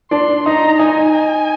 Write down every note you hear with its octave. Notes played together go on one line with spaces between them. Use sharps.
D4 C6
D#4 A#5
D#4 G#5